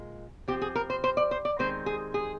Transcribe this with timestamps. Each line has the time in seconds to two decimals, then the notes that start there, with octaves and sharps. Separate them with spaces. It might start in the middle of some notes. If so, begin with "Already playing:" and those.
Already playing: A#2 G#3
0.48 F3 C4 G4
0.62 G#4
0.75 A#4
0.90 C5
1.04 C5
1.17 D5
1.31 C5
1.45 D5
1.59 D#3 G#3 C4 C5
1.86 G#4
2.14 G#4